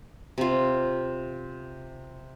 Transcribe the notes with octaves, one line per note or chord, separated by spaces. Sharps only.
C3 F4